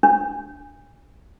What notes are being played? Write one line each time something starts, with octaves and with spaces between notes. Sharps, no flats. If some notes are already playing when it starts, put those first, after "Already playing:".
D4